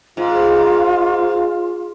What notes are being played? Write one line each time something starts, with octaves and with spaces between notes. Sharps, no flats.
G#2 F4